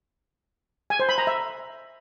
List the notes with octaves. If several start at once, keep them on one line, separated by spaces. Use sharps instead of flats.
G#5
C5
B5
A#5
E5